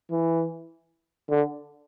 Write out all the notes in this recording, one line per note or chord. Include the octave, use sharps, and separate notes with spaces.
E3
D3